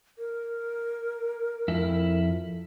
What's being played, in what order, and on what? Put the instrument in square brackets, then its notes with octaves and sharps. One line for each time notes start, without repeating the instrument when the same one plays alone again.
[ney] A#4
[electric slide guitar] F2 E4